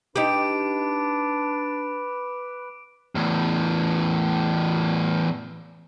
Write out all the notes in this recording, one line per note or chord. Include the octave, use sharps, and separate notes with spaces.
D4 D#4 G4 B4 D6 D7
E2 A2